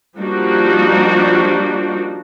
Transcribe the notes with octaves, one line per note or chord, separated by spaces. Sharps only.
F3 G3 A#3 D4 D#4 F#4